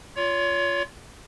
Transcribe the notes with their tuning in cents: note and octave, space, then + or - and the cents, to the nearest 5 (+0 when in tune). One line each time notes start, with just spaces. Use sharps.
F4 +0 C#5 +30